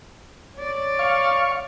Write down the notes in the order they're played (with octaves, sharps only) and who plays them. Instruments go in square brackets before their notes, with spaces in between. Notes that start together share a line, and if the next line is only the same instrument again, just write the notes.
[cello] C#5 D5
[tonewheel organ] F5 C#6